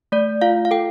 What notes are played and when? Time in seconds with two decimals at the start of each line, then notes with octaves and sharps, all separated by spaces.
0.12 A3 D5
0.42 F4 F5
0.65 F5
0.71 A4 G5